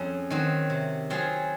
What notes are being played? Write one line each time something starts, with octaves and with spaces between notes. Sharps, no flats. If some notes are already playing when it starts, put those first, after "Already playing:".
Already playing: F2 C#4 G#4
D#3 F#3 C4
C3
F#3 C4 F4 G#4